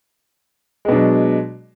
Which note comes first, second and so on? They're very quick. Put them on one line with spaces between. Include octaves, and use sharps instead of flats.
G#3 B2 D4 F#3